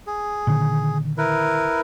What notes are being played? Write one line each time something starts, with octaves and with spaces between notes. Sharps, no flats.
G#4
A#2 D3 D#3
E4 A#4 B4